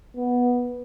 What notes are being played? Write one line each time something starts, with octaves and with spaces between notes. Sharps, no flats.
B3